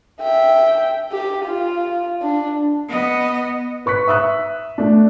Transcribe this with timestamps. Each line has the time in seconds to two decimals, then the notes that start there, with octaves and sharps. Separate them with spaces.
0.22 E5 G5
1.12 G4
1.45 F4
2.22 D4
2.89 B3 D#5
3.86 B4 C#6 F#6 B6
4.07 E5 D#6 E6 F#6
4.78 A3 D4